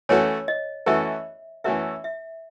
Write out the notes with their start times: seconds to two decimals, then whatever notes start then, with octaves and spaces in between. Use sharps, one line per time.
0.09 E3 A3 C#4 F#4 A4 C#5
0.48 D#5
0.86 E3 A3 C#4 F#4 A4 E5
1.64 E3 A3 C#4 F#4 A4 E5
2.04 E5